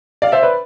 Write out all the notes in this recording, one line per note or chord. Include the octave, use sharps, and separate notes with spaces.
D5 F5
C5 E5
B4 D5